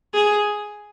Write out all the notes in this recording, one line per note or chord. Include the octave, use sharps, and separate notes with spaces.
G#4